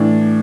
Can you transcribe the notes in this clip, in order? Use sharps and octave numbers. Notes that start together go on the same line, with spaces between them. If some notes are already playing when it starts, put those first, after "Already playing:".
Already playing: A2 E3 D4